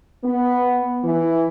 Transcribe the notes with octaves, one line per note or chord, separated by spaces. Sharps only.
B3
E3